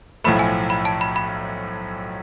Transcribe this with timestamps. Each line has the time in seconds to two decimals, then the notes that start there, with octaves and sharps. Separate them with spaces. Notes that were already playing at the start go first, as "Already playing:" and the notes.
0.24 B1 A2 F3 A3 B5
0.39 G#5
0.70 B5
0.85 A5
1.01 B5
1.16 B5